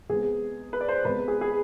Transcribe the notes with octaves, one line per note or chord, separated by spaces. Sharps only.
C3 G#3 B3 G#4
B4
D5
C5
C3 G#3 B3 B4
G#4
G#4